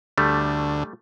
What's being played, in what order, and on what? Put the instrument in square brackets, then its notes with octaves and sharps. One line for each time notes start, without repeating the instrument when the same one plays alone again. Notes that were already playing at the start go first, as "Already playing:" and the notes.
[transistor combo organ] D2 [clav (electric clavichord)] G3 A3